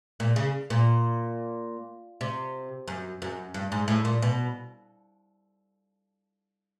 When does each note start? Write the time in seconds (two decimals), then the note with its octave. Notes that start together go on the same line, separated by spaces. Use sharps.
0.20 A#2
0.36 C#3
0.70 A#2
2.21 C3
2.88 F#2
3.22 F#2
3.54 G2
3.72 G#2
3.88 A2
4.05 A#2
4.22 B2